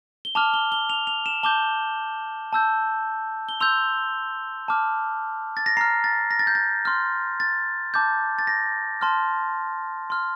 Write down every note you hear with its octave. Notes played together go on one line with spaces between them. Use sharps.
G7
A5 D6 F6 F7
G7
G7
F7
F7
E7
A5 D6 G6 G7
A5 E6 G6
G7
C6 E6 G6 F7
A5 D6 F6
A6
A#6
A#5 F6 C7
A6
A#6
A6
G6
A6
C6 F6
A6
A5 D6 G6
A6
A#6
A5 C6 F6
C6 F6